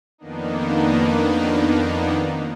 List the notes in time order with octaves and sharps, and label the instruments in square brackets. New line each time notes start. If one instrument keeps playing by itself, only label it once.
[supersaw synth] F2 D#3 A#3 B3 D4 D#4